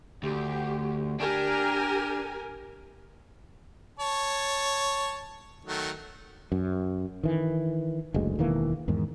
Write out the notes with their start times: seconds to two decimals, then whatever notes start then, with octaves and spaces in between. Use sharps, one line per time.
0.23 D2 G4
1.20 D4 G4 A#4 G#5
4.00 C#5 A5
5.65 D#3 F#3 A3
6.52 F#2
7.23 D#3 E3
8.14 F#1 D2 G#3
8.39 E1 D#3 E3 A#3
8.88 E2 G#2 D#3